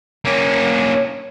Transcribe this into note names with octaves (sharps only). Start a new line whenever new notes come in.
A#3 C#4